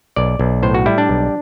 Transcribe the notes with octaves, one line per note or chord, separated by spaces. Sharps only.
B1 D5
B1
A2 C5
F#4
G3 E4
D4
B1